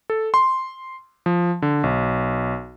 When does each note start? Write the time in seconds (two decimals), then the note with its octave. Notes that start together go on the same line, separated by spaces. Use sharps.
0.10 A4
0.34 C6
1.26 F3
1.62 D3
1.84 B1